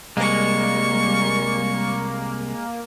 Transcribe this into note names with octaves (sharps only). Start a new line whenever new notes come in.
C2 G3 G#3 A#3 C#6